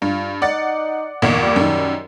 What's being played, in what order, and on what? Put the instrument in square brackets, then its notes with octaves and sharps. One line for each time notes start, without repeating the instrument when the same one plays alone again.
[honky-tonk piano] G2 [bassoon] F4
[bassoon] D#4 [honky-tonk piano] D5 F#5 A6
[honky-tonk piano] G1 E2 A#2 [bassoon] D#3
[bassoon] G3
[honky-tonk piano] F#2 D#3